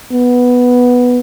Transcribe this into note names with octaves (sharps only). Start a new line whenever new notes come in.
B3